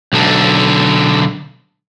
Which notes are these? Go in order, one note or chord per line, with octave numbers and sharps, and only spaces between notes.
B1 D3